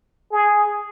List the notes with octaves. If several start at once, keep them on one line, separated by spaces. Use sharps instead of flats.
G#4